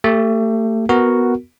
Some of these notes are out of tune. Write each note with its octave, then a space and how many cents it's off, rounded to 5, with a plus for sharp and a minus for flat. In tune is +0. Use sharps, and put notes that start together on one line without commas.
A3 +30 G4 +15
B3 +0 F#4 +0 A#4 +0